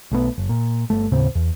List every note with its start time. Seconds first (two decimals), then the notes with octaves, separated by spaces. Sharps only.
0.12 B1 A3 B3
0.38 F#1
0.49 A#2
0.90 G1 A3
1.12 D#2 A2 C#3 C4
1.35 E2